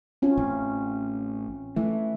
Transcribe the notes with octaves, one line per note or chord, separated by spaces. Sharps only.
C4 C#4 F4
A1
E3 A3